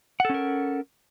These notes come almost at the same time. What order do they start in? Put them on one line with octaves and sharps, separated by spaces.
F#5 A4 C#4 A#4